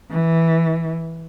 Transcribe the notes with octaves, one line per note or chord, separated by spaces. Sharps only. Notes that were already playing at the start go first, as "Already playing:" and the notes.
E3